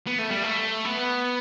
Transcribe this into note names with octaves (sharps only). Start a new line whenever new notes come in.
B3
A3
G3
A3
B3